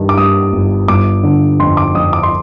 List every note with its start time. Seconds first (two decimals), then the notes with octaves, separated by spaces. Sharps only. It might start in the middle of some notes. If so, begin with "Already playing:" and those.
Already playing: G2 D#3
0.09 D6
0.17 G2 D#6
0.53 G1
0.88 G1 D6
1.23 D3
1.60 F2 C6
1.77 D6
1.94 F2 D#6
2.13 D6
2.23 C6